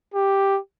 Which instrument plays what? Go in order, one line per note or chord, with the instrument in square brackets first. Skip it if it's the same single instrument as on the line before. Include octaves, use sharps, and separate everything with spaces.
[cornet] G4